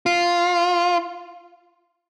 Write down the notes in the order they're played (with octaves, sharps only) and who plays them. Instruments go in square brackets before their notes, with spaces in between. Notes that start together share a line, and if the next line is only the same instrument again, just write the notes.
[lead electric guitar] F4